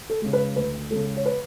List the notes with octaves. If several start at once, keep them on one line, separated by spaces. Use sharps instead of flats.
A4
C#3 G#3
B4
D2 B4
C#3 G#3 A4
C#5
B4